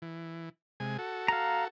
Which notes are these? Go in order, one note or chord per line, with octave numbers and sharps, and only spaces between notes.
E3
C3 G#3 G#5
F#4 A4
F5 A#5